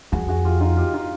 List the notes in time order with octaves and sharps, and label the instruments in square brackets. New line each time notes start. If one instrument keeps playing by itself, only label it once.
[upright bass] F2 [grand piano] F#4 G#4
[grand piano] F#4 G#4
F4 G4
D#4 F4
F4 G4
D#4 F4